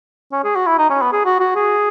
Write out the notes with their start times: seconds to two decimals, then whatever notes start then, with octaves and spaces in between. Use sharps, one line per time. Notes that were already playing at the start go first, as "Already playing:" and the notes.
0.32 C#4
0.44 G#4
0.56 F#4
0.67 E4
0.78 D#4
0.90 C#4
1.02 B3
1.13 G#4
1.25 F#4
1.40 F#4
1.55 G#4